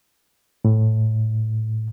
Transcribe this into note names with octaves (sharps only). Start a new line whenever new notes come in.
A2